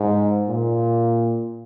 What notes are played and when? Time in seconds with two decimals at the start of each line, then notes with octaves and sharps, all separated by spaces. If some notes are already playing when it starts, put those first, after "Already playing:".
Already playing: G#2
0.48 A#2